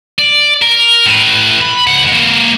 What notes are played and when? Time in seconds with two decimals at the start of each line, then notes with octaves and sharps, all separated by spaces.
0.19 D5
0.62 A#4
1.06 A2 B4
1.62 B5
1.87 C#2 F#5
2.08 G#3 A#3